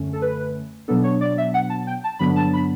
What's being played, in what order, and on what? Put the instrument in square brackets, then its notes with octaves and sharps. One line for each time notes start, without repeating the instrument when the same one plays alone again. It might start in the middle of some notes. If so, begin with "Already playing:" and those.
Already playing: [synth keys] F#2 D3 A3 C#4
A4
B4
B2 F#3 B3 D4 A4
C#5
D5
E5
F#5
A5
G5
A5
G2 D3 F#3 B3 D4 B5
A5
B5